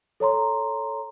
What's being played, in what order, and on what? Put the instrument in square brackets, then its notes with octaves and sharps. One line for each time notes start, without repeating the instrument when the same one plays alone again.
[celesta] A4 C#5 A#5 C6